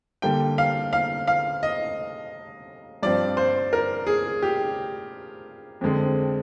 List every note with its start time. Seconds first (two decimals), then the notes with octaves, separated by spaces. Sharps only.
0.22 D3 G3 A#3 G5
0.58 F5
0.93 F5
1.27 F5
1.63 D#5
3.03 G2 F3 C4 D5
3.37 C5
3.73 A#4
4.07 G#4
4.42 G4
5.81 F2 D3 G#3 C4